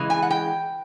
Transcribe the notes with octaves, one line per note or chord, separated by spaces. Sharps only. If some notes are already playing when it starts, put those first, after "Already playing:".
Already playing: C#3 E3 G#3
G#5
F#5
G5